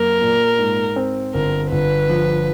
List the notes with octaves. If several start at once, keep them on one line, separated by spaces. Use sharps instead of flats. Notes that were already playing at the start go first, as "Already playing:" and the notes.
Already playing: F#2 A#3 A#4
A#2
G#2
C4
G1 A#4
G1 B4
F3